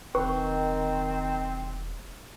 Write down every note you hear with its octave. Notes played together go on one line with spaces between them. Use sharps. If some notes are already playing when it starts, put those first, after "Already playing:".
E1 D#3 C4 B4 C#6